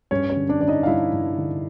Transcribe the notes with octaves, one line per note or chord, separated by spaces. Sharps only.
G2 C#4 C#5
C#4 C#5
D3
D4 D5
D3 D5
D#4 D#5
F5
G2 E4 E5
G2
D3